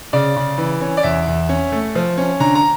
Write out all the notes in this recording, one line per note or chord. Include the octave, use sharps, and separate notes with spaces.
C#3 D5
C#3
E3
C#4
D5
E2 E5
E2
C#4
A3
F3
C#4
D3 A#5
A#5